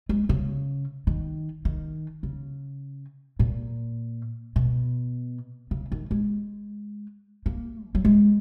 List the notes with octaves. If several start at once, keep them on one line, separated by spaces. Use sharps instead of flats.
G#3
C#3
D#3
D#3
C#3
A#2
B2
C#3
D#3
G#3
A#3
E3
F#3
G#3